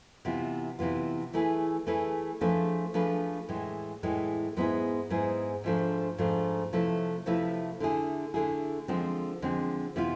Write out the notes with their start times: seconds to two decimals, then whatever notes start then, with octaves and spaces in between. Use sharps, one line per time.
0.25 C3 E3 B3 F4
0.79 C3 E3 B3 F4
1.33 E3 A3 E4 G#4 B4
1.87 E3 A3 E4 G#4 B4
2.41 F3 A3 D4 G#4 B4
2.94 F3 A3 D4 G#4 B4
3.49 A2 E3 G#3
4.03 A2 E3 G#3
4.56 G#2 G#3 B3 E4 G#4
5.10 G#2 G#3 B3 E4 G#4
5.64 G#2 F3 A3 D4
6.18 G#2 F3 A3 D4
6.73 C3 F3 A3 E4 B4
7.26 C3 F3 A3 E4 B4
7.80 D3 A3 E4 G#4
8.34 D3 A3 E4 G#4
8.88 D3 F3 G#3 C4
9.42 D3 F3 G#3 C4
9.96 C3 E3 B3 F4